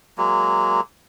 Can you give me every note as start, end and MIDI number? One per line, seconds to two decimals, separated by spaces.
0.18 0.81 54
0.18 0.81 56
0.18 0.81 58